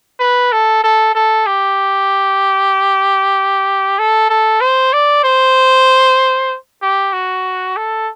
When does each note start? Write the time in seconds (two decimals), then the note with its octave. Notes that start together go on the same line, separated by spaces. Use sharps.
0.20 B4
0.52 A4
0.84 A4
1.15 A4
1.46 G4
3.99 A4
4.30 A4
4.61 C5
4.93 D5
5.24 C5
6.82 G4
7.13 F#4
7.77 A4